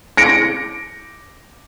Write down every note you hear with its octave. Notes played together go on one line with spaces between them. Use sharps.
A#6 C#7 D7